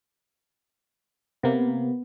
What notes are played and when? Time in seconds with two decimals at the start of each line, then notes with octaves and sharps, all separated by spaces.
1.43 C3 A#3 B3